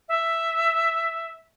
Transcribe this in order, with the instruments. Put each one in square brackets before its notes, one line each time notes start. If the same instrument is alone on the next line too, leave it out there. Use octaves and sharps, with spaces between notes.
[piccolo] E5